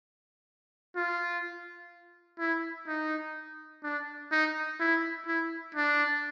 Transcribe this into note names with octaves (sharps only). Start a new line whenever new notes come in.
F4
E4
D#4
D4
D#4
E4
E4
D4